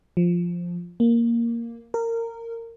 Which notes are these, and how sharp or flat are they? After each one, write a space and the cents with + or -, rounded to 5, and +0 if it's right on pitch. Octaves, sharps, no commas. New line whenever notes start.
F3 +0
A#3 +0
A#4 -20